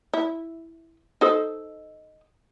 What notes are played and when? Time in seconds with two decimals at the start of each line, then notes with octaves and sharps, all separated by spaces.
0.13 E4
1.21 D#4 A4 C5